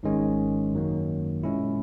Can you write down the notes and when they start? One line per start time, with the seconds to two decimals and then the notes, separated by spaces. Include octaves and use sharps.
0.03 G#1 G#2 D#3 G#3 C#4
0.73 F#2 D#3 F#3 A#3
1.43 A#2 G#3 C#4 E4